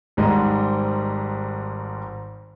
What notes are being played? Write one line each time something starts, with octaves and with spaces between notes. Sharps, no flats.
G#1 G#2 G3 G#3 D#5